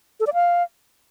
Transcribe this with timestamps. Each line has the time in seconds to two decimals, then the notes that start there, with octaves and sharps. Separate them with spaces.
0.20 A4
0.27 D5
0.34 F5